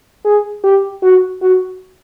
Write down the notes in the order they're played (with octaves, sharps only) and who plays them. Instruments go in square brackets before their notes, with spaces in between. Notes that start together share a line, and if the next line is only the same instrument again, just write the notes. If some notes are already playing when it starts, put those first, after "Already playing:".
[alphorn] G#4
G4
F#4
F#4